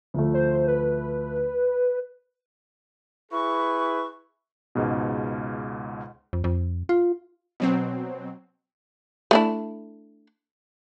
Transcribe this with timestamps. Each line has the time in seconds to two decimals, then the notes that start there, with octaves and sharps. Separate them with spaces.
0.14 D2 F3 A3
0.34 C5
0.68 B4
3.32 E4 G#4 B4 C#6
4.75 C#2 G#2 B2
6.33 F2
6.44 F2
6.89 F4
7.60 B2 F#3 C4
9.31 A3 D4 E4